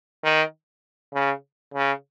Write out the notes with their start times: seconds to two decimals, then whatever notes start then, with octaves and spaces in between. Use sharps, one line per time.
0.24 D#3
1.14 C#3
1.74 C#3